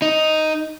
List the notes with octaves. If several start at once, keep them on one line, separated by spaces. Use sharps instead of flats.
D#4